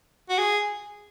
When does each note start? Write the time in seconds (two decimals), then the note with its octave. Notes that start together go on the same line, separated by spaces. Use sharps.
0.30 F#4
0.38 G#4